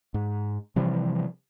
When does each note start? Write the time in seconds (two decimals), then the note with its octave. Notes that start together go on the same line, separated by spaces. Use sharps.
0.14 G#2
0.76 C3 E3 F3 G3